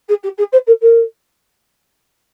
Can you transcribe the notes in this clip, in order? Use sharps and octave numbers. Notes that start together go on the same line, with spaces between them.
G#4
G4
G#4
C5
A#4
A#4